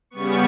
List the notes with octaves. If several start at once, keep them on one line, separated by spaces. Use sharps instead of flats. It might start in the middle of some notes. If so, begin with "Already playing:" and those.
C#3 G3 B3 C#6